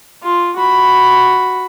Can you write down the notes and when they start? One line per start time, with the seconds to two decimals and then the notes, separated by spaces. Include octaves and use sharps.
0.23 F4
0.57 F#4 B5